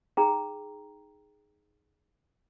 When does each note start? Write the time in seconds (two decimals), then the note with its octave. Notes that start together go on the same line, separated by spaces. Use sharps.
0.17 D#4 G#4 G5 A#5